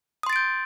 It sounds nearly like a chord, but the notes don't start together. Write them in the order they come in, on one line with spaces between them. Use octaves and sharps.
D#6 C6 A6 D7 G6